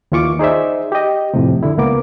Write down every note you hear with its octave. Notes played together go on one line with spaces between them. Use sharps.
D#2 E3 F4 C#6 D6
D#4 G#4 C5 D5 E5
G4 D#5
F2 A2 C3
D3 E4
C#2 C#3 A#3 B3 D6